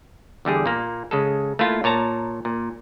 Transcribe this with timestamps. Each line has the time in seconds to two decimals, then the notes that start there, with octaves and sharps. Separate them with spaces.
0.45 E2 D3 G3 G#4
0.66 A#2 A#3
1.11 C#3 G#3 A4
1.59 A3 A#3 E4 F4
1.84 A#2 C#5 A5 A#5
2.45 A#2